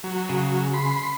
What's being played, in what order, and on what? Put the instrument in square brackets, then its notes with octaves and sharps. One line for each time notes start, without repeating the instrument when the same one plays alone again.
[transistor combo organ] F#3
[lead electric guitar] C#3
[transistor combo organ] B5 C6